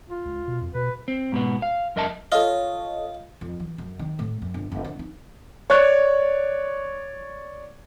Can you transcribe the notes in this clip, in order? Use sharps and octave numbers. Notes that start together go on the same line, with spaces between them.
F4
C#2
B2
F2
B2 B4
C4
G#2 B2 B3
F5
F#2 A#4 D#5 E5 A5
F4 A4 C#5 D#5
F2
E3
F#2
D#3
A2
F#2
G1
F#1
D3
D#4
C#5 D5 C#6 F#6